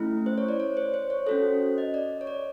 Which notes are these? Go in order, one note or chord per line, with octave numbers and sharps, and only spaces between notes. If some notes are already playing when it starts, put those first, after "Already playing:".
Already playing: A3 C#4 E4
C5
C#5
D5
C#5
C5
C5
C#5
C#4 F#4 A4 C5
D#5
D5
C#5
D5